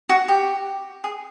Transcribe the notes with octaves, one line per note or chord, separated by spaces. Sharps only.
F#4
G4
G#4